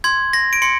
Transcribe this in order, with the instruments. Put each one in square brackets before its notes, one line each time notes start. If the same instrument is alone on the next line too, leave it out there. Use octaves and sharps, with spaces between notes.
[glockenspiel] C6 G#6
C6 A#6
D7
C6 C#7